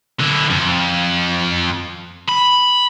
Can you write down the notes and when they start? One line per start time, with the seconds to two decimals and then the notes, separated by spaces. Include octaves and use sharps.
0.20 D3 E4
0.50 F2
2.28 B5